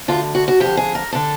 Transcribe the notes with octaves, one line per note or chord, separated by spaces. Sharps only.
D2 D3 F4
F#4
F#4
F2 D3 G4
G#4
A#4
D3 A4